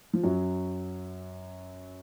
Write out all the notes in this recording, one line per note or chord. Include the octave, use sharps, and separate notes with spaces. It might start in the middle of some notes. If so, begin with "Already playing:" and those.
F3
F#2 F#3